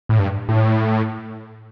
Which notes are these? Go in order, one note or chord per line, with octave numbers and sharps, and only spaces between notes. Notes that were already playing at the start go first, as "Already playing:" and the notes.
A2
G2
A2